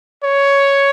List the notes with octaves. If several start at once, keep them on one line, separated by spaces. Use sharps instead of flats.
C#5